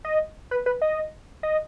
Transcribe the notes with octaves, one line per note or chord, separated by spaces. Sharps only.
D#5
B4
B4
D#5
D#5